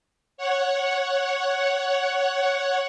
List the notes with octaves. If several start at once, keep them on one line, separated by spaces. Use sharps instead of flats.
C#5 F#5